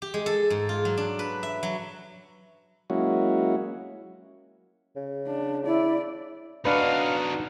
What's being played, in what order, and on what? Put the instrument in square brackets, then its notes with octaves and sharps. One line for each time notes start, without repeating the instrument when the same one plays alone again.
[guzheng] G4
G#3
A4
G#2
F4
F#3
D4
B4
E5
F#3
[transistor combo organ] F#3 G#3 A#3 C#4 E4 F#4
[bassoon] C#3
[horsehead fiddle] D4
[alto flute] E4 [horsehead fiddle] D5
[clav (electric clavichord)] D4 B4 [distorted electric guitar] D#4 F#4 [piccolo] F5